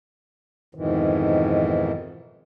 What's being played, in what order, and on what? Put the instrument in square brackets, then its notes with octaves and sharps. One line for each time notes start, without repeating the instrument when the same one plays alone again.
[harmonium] F2 G#2 B2 D#3 E3